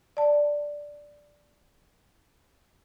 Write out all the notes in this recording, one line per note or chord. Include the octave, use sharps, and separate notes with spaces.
D5 A5